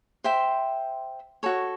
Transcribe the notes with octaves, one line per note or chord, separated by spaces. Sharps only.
C5 E5 G5 C6
F#4 A4 C#5